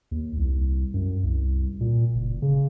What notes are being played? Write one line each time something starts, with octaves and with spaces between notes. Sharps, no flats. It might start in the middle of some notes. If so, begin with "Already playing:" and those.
D#2
C2
F#2
C2
A#2
F#1
C#3